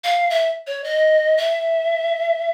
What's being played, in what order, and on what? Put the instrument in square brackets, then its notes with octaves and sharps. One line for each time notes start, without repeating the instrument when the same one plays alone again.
[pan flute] F5
E5
C#5
D#5
E5